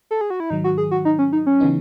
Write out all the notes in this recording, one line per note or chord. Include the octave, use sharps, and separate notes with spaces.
A4
G#4
F#4
E4
G#2 D#3 F#3 D#4
F#4
G#4
F#4
D#4
C#4
D#4
C#4
C#3 E3 B3 D#4